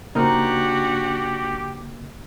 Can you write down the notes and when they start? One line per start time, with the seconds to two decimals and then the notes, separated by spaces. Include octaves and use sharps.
0.15 C#3 A#3 D4 D#4 F#4 G4 A#4 C5